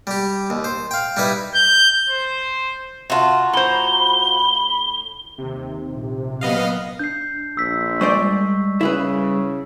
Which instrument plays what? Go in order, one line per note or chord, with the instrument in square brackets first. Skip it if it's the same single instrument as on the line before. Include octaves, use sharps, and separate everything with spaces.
[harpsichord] G3 G4
D#2
C5
F5 G5
G3 D#4 E4 B4
[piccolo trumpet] G6
C5
[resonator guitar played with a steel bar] C3 A5 [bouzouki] F4 F#4
[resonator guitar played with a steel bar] A2 C5 [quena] A#5 [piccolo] G7
[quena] B5
[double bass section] D#2 D#3 [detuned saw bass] C3
[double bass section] A#1
[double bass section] F#3 A#3 [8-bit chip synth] B3 D#5 F5
[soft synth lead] D4 [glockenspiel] G6 C7
[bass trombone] A#1 [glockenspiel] E6 B6
[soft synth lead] G3 [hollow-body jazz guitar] G#3 C5 D5 [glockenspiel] C#6
[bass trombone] C#3 [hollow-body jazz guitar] E4 G#4 B4